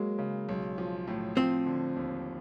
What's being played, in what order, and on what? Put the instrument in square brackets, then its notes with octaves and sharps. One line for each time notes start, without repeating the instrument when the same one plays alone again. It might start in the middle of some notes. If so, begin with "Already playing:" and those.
Already playing: [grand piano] F#3 A#3 [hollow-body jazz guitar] G#3
[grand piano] C#3
B1
F3
A2
[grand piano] F3 [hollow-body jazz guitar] C4
[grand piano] D3
D#2